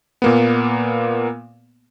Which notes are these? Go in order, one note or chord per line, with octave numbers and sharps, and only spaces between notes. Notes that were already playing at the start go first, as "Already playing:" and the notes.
A#2 A#3 B3